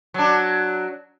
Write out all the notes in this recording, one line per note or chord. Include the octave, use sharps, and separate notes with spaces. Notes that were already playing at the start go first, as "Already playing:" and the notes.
F#3 D4